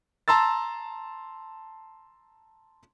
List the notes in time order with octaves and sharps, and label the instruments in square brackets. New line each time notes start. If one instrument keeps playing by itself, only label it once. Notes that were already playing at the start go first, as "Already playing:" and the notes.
[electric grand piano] A5 A#5 C6 E6 A6